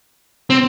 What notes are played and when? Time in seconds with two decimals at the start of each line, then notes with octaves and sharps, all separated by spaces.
0.50 C4